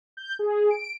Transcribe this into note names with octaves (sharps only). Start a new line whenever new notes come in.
G6
G#4
D7